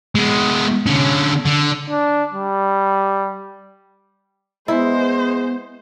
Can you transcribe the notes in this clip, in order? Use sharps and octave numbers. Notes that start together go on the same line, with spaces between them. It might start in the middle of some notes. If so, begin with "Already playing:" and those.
G#3 B3
D3 C#4
D3
D4
G3
G#3 B3 E4 C5